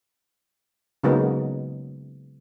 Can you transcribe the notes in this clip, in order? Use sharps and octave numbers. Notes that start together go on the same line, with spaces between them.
C#3 F#3 G#3 A#3 B3 D#4